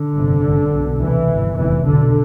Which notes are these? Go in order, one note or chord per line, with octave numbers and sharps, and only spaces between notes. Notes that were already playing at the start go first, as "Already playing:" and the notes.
Already playing: D3
G1 F2 C3
A1 G2
B1 B2
D2 C3 E3
G1 G2
F1 E2 B2 E3
B1 B2 D3